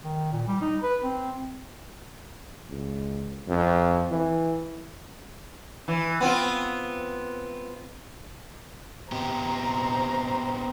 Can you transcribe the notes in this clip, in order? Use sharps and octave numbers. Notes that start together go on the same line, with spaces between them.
D#3
A#2
G3
D#4
B4
C4
C#2
F2
E3
E3
B3 C4 F4
B3 C4 G4 C5 A#5